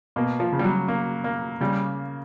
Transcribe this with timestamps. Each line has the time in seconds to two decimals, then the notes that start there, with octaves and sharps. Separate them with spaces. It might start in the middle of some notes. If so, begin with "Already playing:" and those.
0.16 B2 A#3
0.40 F3
0.52 C#3
0.59 G3
0.64 F#3
0.88 A#3
1.24 A#3
1.61 C#3 G3